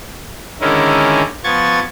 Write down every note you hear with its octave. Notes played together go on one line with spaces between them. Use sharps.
D3 D#3 G#3 C#4 E4 A#4
F3 B3 C#6 G#6 A6